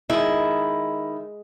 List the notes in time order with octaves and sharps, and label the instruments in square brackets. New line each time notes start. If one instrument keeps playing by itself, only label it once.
[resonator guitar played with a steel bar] D#3 E4 [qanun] G#3